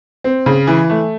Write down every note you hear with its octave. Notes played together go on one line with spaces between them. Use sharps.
C4
C#3
E3
A3